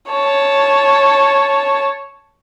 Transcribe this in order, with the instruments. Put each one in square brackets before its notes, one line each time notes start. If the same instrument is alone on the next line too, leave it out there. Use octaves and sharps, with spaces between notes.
[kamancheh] C#5 A5